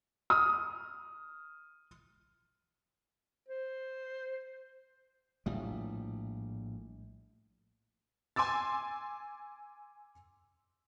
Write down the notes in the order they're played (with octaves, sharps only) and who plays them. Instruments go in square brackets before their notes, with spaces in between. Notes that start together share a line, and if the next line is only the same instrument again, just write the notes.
[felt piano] D#6 F6
[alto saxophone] C5
[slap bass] A#1 A2 G3
[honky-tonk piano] G#5 C6 D6 E6 A6